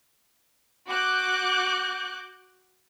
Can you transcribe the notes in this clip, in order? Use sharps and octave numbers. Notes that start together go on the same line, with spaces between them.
F#4 D6 F#6 G6